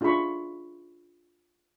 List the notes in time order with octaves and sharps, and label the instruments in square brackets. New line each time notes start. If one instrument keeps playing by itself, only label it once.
[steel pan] D4 F4 G#4 E5 B5 C#6